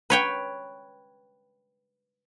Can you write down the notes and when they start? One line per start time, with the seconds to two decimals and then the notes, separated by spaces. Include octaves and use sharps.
0.10 B4 C#5 G5